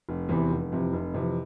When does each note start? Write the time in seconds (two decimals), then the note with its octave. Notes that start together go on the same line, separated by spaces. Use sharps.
0.09 F1
0.29 E2 C3 E3 B3
0.50 F1
0.72 F2 C3 E3
0.93 F1
1.14 F2 C3 E3